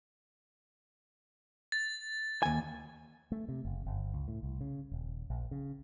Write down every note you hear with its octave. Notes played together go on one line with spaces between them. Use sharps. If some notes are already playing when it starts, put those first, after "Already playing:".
A6
D#2 G#5
A3
C3
F#1
G1
C#2
A2
C2
C#3
D#1
A#1
C#3